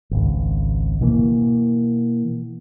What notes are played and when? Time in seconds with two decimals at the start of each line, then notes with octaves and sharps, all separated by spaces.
0.11 G#1 C#2
1.01 B2 E3 A#3